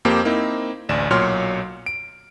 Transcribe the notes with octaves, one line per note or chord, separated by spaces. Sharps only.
F2 A#3 G4 C5
A#3 C4 D#4 E4
A1 D2 D5 E7
B1 A#2 F#3 C#5 C6 F6
D7